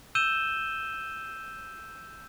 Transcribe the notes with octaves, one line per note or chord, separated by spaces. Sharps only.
E6 G6 D#7 E7 G7